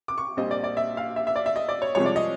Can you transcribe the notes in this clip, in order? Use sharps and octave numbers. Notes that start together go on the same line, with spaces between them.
D6
C#6
A#1 A#2 G3 C4 D#5
D5
D5
E5
F5
E5
E5
D5
E5
D#5
D5
C#5
C2 C3 F3 G#3 C#5
D5
D#5